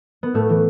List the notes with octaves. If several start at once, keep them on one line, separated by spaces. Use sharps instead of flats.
B3
A2 A3
E3